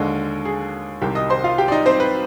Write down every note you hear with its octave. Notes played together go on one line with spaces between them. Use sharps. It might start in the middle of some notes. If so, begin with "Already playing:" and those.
Already playing: D#2 D3 G#3
G#4
C2 C3 D#3 G4 G5
D#5 D#6
C5 C6
F4 F5
G4 G5
D5
D#4 D#5
C4 C5
B4